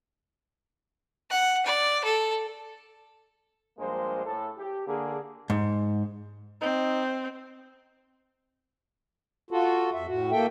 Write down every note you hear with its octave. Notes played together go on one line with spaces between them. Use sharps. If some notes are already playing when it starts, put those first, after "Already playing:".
F#5
D5
A4
A#1 G2 F3 G#3 A#3 C5
A2 A4
G4
D3 A#3 G#4
G#2
C4 D#4
F4 F#4 A4
F2 E5
A2 F#4
A#3 A4 E5 G5